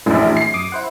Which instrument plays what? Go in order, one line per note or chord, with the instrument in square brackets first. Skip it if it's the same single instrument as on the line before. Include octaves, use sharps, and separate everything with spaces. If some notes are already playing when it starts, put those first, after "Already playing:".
[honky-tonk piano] A#1 F#2 [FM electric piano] A2 E3 D4
[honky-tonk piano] C7
[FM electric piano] F#2 D6 D#6
E4 C5 F#5